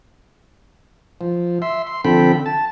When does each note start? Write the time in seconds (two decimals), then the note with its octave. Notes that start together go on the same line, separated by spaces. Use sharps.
1.21 F3
1.62 E5 C6
1.87 C6
2.04 D3 F3 C4 A4 G5 B5
2.46 A5